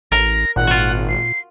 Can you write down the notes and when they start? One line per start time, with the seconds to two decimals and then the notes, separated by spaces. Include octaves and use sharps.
0.12 A1 A#4 A#5 A#6
0.56 G#1 A#2 F#5
0.67 F4 F#4
1.09 C7